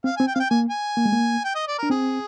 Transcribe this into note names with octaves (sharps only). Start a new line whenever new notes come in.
C4 F5
C4 G#5
G5
C4 F5
G5
A#3 G#5
G#5
A#3
G#3
A#3
G5
D#5
D5
D4 A#4
C4 G#4